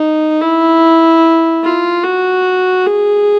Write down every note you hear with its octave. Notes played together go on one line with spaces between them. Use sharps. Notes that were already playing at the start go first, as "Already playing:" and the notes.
Already playing: D#4
E4
F4
F#4
G#4